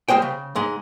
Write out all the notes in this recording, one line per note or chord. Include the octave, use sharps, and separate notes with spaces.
G3 G#3 C5 G5
C#3
G#2 G#3